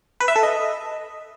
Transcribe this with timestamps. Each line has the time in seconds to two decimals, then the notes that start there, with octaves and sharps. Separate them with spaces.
0.20 B4
0.28 E5
0.36 A4
0.43 D#5